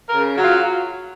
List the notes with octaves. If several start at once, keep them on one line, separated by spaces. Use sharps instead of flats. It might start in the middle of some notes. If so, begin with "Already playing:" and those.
A#4
C#3
F#3
F4